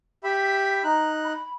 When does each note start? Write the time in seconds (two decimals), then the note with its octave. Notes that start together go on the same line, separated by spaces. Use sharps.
0.24 G4 E5 B5
0.84 D#4 A#5 F#6
1.24 B5